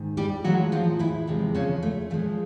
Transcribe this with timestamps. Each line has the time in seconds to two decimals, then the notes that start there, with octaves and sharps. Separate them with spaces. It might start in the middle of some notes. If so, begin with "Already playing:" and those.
Already playing: G#2 D#3
0.17 G3 G4
0.44 A2 F3 F#3 G#3 F#4
0.72 F3 F4
0.99 E3 E4
1.27 E2 C3 F3 G#3
1.55 C#3 C#4
1.83 A3
2.10 A#2 F3 G#3 A3